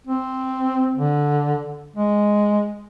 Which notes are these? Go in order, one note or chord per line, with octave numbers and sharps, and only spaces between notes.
C4
D3
G#3